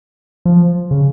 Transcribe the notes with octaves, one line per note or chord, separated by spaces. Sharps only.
F3
C#3